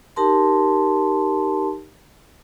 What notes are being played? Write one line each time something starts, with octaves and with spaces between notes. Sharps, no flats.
D#4 G4 A#4 A5 C6